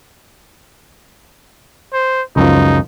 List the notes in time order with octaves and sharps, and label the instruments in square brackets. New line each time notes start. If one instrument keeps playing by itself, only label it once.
[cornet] C5
[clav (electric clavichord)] C#2 F#2 F3 [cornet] D#4